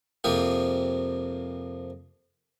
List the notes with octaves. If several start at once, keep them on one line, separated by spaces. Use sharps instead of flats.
F2 C3 F3 A#3 G4 G#4